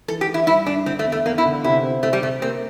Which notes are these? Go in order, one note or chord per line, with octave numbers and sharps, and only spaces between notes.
E3 A4
G4
E3
E4
G2 E4
G2 D4
D3 C4
A3
E2
A3
E2 A#3
E4
D3
C3 E4
C4
C3 A3
G3
C3 A3
A#3 C4